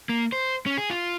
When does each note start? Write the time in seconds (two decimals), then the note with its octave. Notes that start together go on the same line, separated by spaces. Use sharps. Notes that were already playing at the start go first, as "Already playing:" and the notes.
0.09 A#3
0.32 C5
0.66 C#4
0.78 G#4
0.90 F4